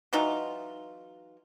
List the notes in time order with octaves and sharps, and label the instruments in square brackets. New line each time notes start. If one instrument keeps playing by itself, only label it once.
[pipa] E3 F#3 D#4 F4